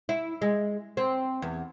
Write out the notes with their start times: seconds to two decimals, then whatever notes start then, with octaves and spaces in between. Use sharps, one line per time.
0.09 E4
0.42 G#3
0.97 C4
1.42 E2